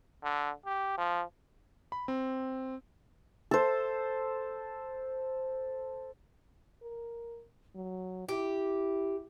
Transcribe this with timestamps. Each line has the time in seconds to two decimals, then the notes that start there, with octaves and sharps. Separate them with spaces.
0.23 D3
0.66 G4
0.98 F3
1.92 B5
2.08 C4
3.51 A4 C5
6.82 A#4
7.75 F#3
8.29 E4 G4